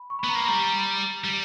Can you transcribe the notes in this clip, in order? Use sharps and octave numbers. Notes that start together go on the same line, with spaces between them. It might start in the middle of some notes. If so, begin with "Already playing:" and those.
Already playing: B5
C#6
B5
B3
A#5
A#3 B5
G3 A#5
G3